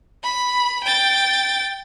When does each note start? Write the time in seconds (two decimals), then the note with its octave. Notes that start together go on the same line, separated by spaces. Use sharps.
0.23 B5
0.84 G5 A6